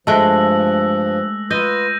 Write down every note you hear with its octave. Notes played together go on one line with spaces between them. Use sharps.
G2 F3 G#3 A3 E6 F#6 A#6
F4 B4 D#5 G6 A#6 D#7